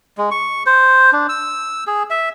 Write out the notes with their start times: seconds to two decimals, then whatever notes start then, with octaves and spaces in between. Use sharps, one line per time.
0.18 G#3
0.31 C#6
0.66 C5
1.13 D4
1.29 E6
1.87 G#4
2.10 E5